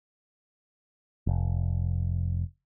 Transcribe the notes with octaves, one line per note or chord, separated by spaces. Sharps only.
F1